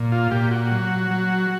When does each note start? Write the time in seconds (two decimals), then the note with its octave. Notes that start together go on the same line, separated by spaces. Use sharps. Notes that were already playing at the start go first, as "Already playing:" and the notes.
Already playing: A#2
0.12 F4
0.31 A#2 G4
0.51 F#4
0.71 F#3
1.11 F#3